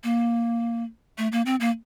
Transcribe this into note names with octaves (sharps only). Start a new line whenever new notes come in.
A#3
A3
A#3
C4
A#3